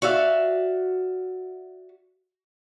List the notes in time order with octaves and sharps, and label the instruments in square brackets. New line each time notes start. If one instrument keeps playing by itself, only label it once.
[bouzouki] F#4 D5 E5 F5